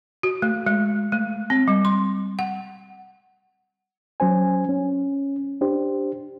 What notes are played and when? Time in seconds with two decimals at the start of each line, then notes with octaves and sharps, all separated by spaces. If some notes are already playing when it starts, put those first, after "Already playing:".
0.23 F#4
0.42 A3
0.66 G#3
1.12 A3
1.50 C4
1.68 G3
1.85 C6
2.39 F#5
4.20 F#3 C#4 C5 G#5
4.69 C#4
5.61 D4 G4 C5